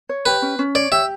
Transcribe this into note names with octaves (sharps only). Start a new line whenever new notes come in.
C#5
G4 B4
C#4
C#4
C#5 D5
G4 E5